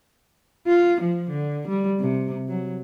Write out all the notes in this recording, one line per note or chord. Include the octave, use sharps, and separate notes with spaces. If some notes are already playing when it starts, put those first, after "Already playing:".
F4
F3
D3
G3
C3
F#3